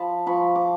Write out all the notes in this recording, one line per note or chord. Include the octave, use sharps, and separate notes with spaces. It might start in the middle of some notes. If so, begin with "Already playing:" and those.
Already playing: F3 A5 B5
F3 B5 C#6
D6